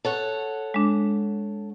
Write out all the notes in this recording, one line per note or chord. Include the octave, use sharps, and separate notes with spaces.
A4 C#5 F#5
G#3 D4